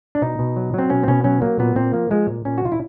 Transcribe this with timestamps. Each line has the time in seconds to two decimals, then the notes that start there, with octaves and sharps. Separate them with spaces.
0.15 D4
0.21 B2 D#4
0.39 B2
0.56 F#3
0.74 F#3 C4
0.90 B2 C#4
1.03 C4
1.08 B2 C#4
1.24 F#3 C#4
1.42 F#3 A#3
1.59 A#2 B3
1.76 A#2 C4
1.93 F3 A#3
2.10 F3 G#3
2.28 A#2
2.45 A#2 C#4
2.58 F#4
2.62 F3 F4
2.72 E4